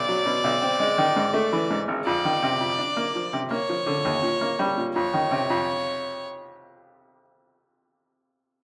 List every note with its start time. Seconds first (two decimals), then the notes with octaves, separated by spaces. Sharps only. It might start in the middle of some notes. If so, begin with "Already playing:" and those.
Already playing: B1 D5
0.08 F#3
0.26 B2
0.44 B1
0.62 C4
0.80 G#3
0.98 D#3
1.16 G#2
1.34 A3
1.53 E3
1.70 G#2
1.88 G#1
2.06 F2 D5
2.25 D#3
2.43 C3
2.60 F2
2.79 D4
2.96 A#3
3.15 F3
3.33 C3
3.51 A#3 C#5
3.69 F3
3.86 D3
4.05 D#2
4.22 A#2
4.41 A#3
4.59 G3
4.77 A#2
4.95 F2 C#5
5.13 D#3
5.31 C3
5.50 F2